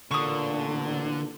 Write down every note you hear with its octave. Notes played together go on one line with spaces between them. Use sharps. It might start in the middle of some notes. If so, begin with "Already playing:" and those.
A1 A#2 D3 C#6 D#6